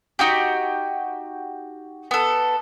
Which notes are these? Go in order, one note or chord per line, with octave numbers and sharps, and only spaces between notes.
D#4 F#4 G4
B3 A4